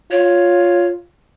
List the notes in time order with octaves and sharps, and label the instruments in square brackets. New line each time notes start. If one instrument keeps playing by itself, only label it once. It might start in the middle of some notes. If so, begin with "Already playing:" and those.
[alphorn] F4 [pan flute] C#5